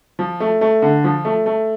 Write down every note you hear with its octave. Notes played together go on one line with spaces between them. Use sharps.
F3
A3
A3
D3
F3
A3
A3